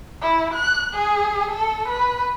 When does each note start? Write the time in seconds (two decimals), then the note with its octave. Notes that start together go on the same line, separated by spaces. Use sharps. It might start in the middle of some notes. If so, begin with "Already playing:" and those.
0.22 E4
0.54 F#6
0.94 G#4
1.51 A4
1.88 B4